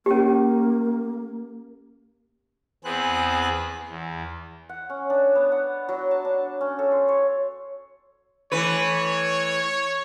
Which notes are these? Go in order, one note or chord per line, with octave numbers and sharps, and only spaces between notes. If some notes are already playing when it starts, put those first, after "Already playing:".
A#3 C#4 G4
E2 B3 C4 G#4 F#6
E2
F#5
C#4
D4
B3
F#5
F#3
A5
D4
C#4
A4
C5
C#5
E3 A3 B4 C#5